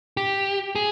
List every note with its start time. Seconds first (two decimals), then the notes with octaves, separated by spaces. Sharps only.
0.17 G4
0.75 G#4